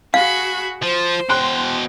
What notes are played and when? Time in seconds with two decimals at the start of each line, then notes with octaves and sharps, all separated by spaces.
0.14 F#4 G#4 F5 B5
0.82 F3 C5
1.29 B2 G5 C6 F#6